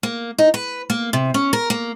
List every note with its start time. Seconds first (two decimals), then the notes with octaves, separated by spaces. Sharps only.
0.03 A#3
0.38 D#4
0.54 B4
0.90 A#3
1.13 C3
1.34 C#4
1.53 A#4
1.70 A#3